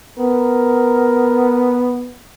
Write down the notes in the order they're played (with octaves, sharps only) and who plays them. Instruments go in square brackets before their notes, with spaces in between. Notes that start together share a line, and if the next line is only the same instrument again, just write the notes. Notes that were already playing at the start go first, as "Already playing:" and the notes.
[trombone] B3 [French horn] A#4